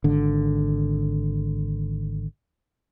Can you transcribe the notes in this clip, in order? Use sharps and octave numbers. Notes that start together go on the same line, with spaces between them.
G#1 D3